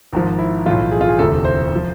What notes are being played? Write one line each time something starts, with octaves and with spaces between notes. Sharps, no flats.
G#1 G#2 F3
E4
B1 A2 E3 F4
G#4
F4
G#4
E1 D2 C3 A4
C5
F3